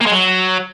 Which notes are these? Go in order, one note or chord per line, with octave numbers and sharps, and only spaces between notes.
A#3
G#3
F#3